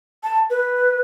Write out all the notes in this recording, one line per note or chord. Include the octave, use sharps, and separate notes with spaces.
A5
B4